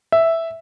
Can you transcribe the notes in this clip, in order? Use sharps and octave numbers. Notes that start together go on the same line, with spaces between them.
E5